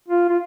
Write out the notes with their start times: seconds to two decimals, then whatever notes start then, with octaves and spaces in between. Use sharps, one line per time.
0.08 F4
0.30 F4